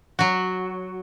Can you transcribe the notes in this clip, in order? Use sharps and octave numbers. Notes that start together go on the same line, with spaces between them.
F#3 F#4